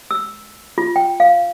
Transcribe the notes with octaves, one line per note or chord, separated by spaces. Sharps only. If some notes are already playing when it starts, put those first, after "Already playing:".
E6
F4
G5
F5